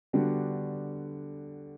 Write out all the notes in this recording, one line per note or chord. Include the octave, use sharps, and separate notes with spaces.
D3 G3 B3 D4 F#4